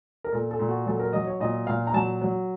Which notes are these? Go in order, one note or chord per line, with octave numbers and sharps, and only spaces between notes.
A#4
A#2 A4
A4
A#2
F#4
F#3 A4
A#4
F#3 D#5
C#5
A#2 D#5
A#2 F5
A#5
F#3 A5
F#3